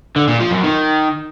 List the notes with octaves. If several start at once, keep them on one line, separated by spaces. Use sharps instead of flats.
D3
A#2
F3
F#2
D#3